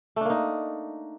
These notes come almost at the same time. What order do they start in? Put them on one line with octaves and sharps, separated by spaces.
A3 D4 A#3 D#4